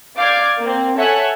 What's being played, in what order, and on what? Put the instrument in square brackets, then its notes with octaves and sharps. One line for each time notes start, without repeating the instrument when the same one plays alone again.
[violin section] D5 F5 D6 G6 G#6
A#3 C4
A4 C#5 E5 F#5 G#5 F#6